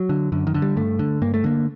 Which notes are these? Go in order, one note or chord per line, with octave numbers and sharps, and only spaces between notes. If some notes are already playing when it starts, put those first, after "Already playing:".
Already playing: F#3
D3
F#2 D3
D#3
D3
G3
G2 A3
D3
G2 A#3
A3
D3 A#3